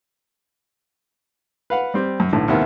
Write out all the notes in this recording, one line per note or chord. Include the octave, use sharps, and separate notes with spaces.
B4 F5 F#5
G3 C4 G4
F#2
B1 A2 D3
D#2 C3 B3 E4 A#4